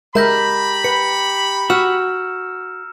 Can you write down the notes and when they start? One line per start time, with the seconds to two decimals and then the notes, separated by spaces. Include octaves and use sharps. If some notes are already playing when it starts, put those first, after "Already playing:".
0.15 G#3 G4 A#4 E5 A#5 B5 G6 A#6
0.84 B4 C#7
1.70 F#4 E6 F6 E7